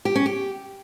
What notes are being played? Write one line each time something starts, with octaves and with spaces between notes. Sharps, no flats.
G4
C#4
G4